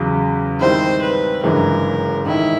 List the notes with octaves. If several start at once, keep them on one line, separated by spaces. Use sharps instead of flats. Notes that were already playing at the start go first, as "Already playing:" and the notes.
Already playing: E2 C#3 F#3
G#2 D#3 G3 C4 E4 C5
B4
G1 F#2 C#3 E3 G#3 A#4
A1 G#2 D#3 E4